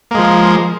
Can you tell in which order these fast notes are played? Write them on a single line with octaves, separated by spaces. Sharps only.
A#3 G#3 F3